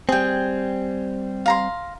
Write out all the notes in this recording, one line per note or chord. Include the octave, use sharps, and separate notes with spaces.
G3 C4 G#4 G5
F5 A#5 C6